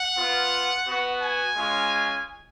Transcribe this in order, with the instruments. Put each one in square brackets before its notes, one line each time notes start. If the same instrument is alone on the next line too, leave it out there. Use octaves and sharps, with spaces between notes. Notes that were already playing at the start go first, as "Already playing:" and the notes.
Already playing: [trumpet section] F#5
B3 F4
B3 F#4
G#5
G#3 C#4 F4